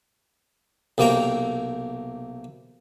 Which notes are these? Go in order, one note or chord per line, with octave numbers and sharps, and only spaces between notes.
B1 C3 A#3 G5 A#5